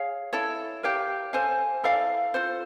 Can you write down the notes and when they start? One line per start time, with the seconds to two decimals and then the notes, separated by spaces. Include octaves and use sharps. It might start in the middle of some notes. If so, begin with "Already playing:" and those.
Already playing: G#4 C#5 F5
0.33 E4 A4 C#5
0.83 G4 A#4 C#5 F5
1.33 A4 C5 F5 G#5
1.84 E4 A4 D5 F5
2.34 F4 A4 C5